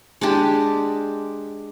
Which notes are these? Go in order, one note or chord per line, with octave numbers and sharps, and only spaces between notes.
G#3 D4 G4